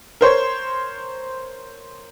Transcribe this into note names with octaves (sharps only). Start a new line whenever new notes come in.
A#4 C5 C#5